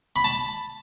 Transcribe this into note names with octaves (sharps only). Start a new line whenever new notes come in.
B5
A5